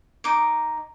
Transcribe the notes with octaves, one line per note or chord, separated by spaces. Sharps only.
D#4 D6